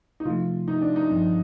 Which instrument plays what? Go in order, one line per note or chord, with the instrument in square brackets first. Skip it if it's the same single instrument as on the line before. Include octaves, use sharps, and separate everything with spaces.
[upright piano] D#4
[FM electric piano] C3 F3 A3 [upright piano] F4
[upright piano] D#4
D4
D#4
[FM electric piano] G2 F3 C4